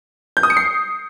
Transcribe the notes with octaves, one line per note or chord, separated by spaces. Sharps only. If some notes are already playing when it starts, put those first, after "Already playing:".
G6
D#6
C#7
C7